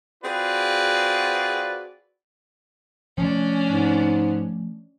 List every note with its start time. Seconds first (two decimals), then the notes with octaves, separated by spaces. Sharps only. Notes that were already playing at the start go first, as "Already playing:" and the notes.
0.23 C4 F4 F#4 G#4 B4 D5
3.18 F3 A3 C#4 D4
3.68 G#2